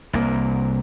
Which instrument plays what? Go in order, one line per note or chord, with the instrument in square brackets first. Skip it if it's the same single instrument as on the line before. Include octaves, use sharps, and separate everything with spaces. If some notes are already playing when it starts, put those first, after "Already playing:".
[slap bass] C2 A#3